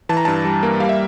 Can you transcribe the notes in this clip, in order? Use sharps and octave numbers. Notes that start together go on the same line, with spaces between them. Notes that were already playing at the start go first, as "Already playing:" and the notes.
E3 A5
A#5
G2 A5
G3
A#3
G3 F5
E5